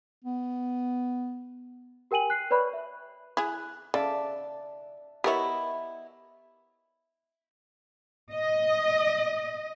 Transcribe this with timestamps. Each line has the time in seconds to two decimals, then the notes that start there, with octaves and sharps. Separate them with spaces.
0.25 B3
2.11 G4 A#4 G5 G#5 D#7 F#7
2.30 F#6 C7
2.51 B4 C#5 D5 B5 C#6 F#6
2.73 E5
3.37 E4 G#4 F#6
3.94 C#3 D5 E5 A5
5.24 B3 E4 G4 A#4 C#5 D#5
8.34 D#5